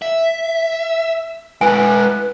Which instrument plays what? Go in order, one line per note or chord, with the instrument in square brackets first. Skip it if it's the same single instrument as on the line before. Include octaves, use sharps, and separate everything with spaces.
[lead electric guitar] E5
[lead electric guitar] G#3 E4 [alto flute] B4 [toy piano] G#5